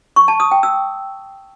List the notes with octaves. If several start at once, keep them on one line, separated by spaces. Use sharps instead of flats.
C#6
A5
D#6
G5
E6